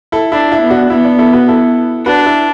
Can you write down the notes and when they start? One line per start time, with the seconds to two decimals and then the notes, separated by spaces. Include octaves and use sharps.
0.12 E4 A4
0.32 D4 E4
0.52 E4
0.62 B3
0.71 D4 F#4
0.90 B3 E4
1.04 D4
1.19 E4 A4
1.33 F#4 B4
1.48 E4 A4
2.06 D4 F#4 B4
2.26 E4